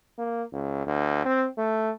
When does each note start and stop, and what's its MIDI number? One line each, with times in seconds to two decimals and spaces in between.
0.19 0.43 58
0.53 0.85 37
0.86 1.25 38
1.25 1.46 60
1.58 1.91 57